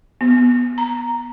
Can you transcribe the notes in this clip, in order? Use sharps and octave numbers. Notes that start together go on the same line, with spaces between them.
B3
A#5